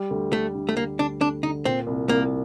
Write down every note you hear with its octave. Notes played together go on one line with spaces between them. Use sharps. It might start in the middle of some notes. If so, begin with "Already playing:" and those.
Already playing: G3
D2
D2 A3
D3
A3
D2 A#3
D2 D4
D2 D4
D3 D#4
A#2 C4
C2
C2 A#3